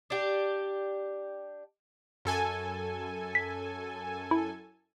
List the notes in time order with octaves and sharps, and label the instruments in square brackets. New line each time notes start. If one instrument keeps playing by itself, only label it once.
[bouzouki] D4 G4
[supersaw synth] F#2 A4 G#5
[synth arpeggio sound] B6
E4